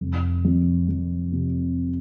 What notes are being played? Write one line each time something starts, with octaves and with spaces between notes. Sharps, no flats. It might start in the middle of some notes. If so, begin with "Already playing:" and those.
F1
F2
F2
C3